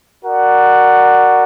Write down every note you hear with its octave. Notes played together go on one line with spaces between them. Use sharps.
F#4 A#4 D5 F#5